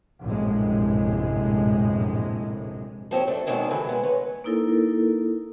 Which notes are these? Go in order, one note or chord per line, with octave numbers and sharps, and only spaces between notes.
A#1 F#2 A2 C3 G#3
F3 C4 G4 C#5
A3 D4
G#2 B2 D#3 G#3 C4 C#4
G2 D3 E3
G#3 B3
B4 C#5
A#3 D#4 E4 A4 A#4